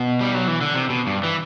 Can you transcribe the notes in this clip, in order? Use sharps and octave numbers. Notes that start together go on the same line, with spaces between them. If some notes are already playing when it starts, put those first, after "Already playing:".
Already playing: B2
G3
F#3
E3
D3
C3
B2
G2
E3